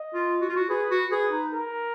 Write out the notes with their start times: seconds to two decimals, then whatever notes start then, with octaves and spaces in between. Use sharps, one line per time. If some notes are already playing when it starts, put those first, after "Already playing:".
Already playing: D#5
0.14 F4
0.41 F#4
0.49 F4
0.56 F#4
0.69 G#4 B4
0.91 F#4
1.11 G#4 B4
1.32 D#4
1.54 A#4